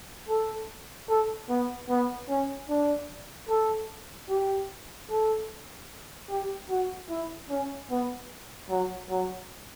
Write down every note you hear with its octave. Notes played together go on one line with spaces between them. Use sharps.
A4
A4
B3
B3
C#4
D4
A4
G4
A4
G4
F#4
E4
C#4
B3
F#3
F#3